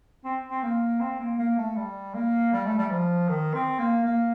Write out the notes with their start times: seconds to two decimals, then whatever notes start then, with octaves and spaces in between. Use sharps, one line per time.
0.25 C4
0.50 C4
0.63 A#3
1.00 C4
1.19 A#3
1.39 A#3
1.58 A3
1.76 G3
2.14 A#3
2.53 G3
2.66 A3
2.78 G3
2.91 F3
3.29 D#3
3.54 C4
3.79 A#3
4.05 A#3